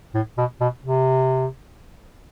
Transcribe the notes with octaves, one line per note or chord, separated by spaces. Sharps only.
A2
B2
B2
C3